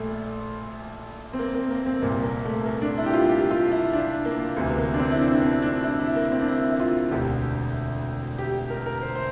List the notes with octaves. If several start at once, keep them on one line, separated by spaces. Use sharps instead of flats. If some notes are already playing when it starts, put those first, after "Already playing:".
Already playing: A#1 A#2 A3
C4
A#3
A#3
A#3
C4
C2 A#2 A#3
A#3
A3
A#3
D4
E4
G4
F4
G4
F4
E4
D4
A#3
D2 C3 E3
A#3
D4
C4
E4
D4
D4
C4
D4
E4
E4
A#3
C4
D4
E4
E4
F4
E1 D2 D3 G4
G4
A#4
A#4
C5
C5